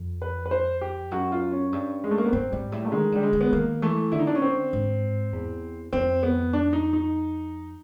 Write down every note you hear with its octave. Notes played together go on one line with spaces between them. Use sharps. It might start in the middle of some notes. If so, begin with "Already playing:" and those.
Already playing: F2
B4
B4
C5
G4
F#2 F#4
F4
C#4
G2
G#3
A3
A#3
B3
G2 C4
G#2 G3
A2 G3
A3
D#3 G#3
D3 G3
G#3
D3
B3
D#3 A#3
E3 A3
D3 E4
D#4
D4
C#4
C4
G#2
E2
F2 C4
B3
D4
D#4
D#4